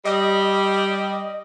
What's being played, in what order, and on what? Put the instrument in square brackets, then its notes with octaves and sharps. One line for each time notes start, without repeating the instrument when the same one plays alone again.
[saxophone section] G3 [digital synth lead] D#5